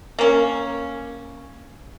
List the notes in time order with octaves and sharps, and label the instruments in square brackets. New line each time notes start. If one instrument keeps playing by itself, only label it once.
[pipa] A#3 C#4